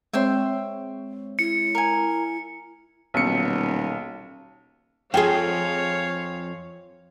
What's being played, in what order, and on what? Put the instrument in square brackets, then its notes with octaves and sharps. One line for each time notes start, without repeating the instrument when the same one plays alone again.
[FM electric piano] G#3 C4 C#5 [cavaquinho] E5 G5 C6
[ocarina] E4 [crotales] C#7
[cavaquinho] A#4 G#5
[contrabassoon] D#1 [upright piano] B1 C#7
[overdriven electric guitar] F2 A4 [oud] F4 G#4 [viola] C#5 F5 [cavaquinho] G5 G#5